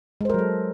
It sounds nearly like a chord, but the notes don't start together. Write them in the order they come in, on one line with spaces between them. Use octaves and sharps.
G#3 C5 A#4 F#3 A4